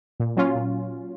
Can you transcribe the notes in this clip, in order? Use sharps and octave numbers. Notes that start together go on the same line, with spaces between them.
A#2
F#3 C#4 F4
A#2